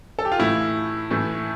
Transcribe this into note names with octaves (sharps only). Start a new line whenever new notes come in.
A4
G4
F4
A2 E3 A3 E4
A2 E3 A3